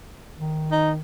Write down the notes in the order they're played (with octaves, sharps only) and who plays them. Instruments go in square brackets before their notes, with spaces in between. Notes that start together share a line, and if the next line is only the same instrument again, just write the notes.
[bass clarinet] D#3
[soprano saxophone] D#4